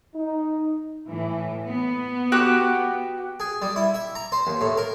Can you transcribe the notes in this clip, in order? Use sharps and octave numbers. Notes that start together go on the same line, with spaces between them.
D#4
A2 E3
B3
F#4 G4 F#6
G#4
G3
E4
E5
A#5
C5
D#2
A2
A#4